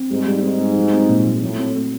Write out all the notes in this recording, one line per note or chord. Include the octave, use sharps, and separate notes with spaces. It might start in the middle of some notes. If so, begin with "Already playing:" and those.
Already playing: C4
G#2 G3
G3
G#2 C4
G3
F#3
C4
A#2
F#3
A2 F#3
C4
A3